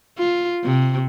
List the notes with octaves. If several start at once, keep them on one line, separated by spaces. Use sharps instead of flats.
F4
C3